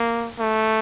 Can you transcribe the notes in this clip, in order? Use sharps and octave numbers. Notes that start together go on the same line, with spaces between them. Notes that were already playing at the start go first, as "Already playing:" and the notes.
Already playing: A#3
A3